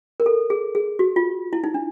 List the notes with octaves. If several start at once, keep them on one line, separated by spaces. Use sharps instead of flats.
A#4
A4
G#4
G#4
F#4
F4
E4
D#4
D4